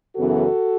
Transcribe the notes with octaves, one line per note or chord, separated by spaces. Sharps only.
F#2 C#3 E3 B3 F#4 A4